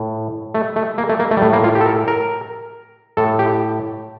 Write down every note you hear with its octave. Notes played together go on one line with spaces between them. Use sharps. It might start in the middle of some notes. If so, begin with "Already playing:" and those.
Already playing: A2
A3
A3
A#3
A3
A#3
A3
G3
A2 A3
A#3
F4
G4
A4
A#4
A#4
A2 A4
G4